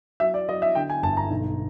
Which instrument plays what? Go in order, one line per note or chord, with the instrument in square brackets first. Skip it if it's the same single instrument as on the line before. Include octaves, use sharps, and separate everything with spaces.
[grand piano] F#3 E5
D5
F#3 D#5
E5
D3 G5
G#5
G1 A5
A#5
B1